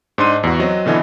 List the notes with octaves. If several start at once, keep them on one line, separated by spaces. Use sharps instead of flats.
G#2 D4 D#5 C6 D#7
E2 F#4
F#3 C4 D#5
B2 D3 E3 D#5